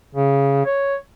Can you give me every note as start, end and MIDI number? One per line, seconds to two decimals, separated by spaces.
0.15 0.63 49
0.66 0.95 73